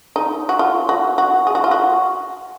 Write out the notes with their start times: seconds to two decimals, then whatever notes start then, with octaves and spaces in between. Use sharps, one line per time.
0.16 D#4
0.49 F#4
0.59 F4
0.89 F#4
1.18 F#4
1.47 G#4
1.55 F#4
1.64 F4
1.71 F#4